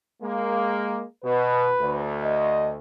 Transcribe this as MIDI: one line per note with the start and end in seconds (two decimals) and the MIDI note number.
0.22 1.03 56
0.22 1.03 58
1.24 1.69 47
1.24 2.06 71
1.81 2.79 38
2.24 2.71 75